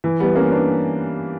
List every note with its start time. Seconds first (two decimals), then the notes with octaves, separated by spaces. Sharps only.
0.04 E3
0.20 G3 B3
0.35 A#3 C#4
0.52 B3 D4